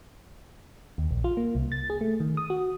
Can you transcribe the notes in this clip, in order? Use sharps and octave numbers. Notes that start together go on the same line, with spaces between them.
D#2
A#1
F4
A#3
C2
A6
G#4
A3
D#3
D#6
F#4